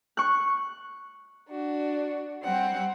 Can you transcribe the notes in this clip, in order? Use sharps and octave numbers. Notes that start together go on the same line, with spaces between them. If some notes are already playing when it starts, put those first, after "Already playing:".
C#6 F#6
D4 F#4
G3 C4 F#5